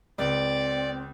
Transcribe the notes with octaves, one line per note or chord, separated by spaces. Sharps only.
C#2 C4 D5